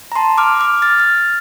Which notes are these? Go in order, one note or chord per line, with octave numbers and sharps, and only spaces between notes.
A#5
A5 C6
D6 F6
D6 F6
F6 A6
F6 A6